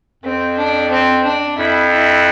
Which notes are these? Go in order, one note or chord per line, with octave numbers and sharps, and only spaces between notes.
F2 C4
D4
C4
D4
F2 E4
E4